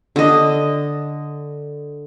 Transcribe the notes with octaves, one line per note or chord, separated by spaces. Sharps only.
D3 D#5